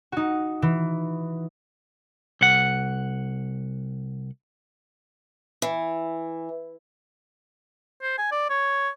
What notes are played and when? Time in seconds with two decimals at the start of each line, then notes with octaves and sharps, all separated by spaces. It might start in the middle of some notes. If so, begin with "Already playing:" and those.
0.12 D#4 F#4
0.62 E3
2.41 C2 F#5
5.62 E3
8.02 C5
8.18 G#5
8.31 D5
8.50 C#5